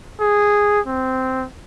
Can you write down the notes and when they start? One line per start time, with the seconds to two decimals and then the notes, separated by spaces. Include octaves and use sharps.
0.21 G#4
0.87 C4